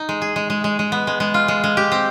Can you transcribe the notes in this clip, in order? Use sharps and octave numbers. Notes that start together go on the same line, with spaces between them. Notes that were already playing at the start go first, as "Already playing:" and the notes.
Already playing: D#4
G#3
G#4
G#3
G#3
G#3
G#3
B3
G#3
G#3
F4
G#3
G#3
G4
C4